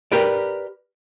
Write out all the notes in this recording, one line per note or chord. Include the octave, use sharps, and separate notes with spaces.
G4 A#4 B4 D5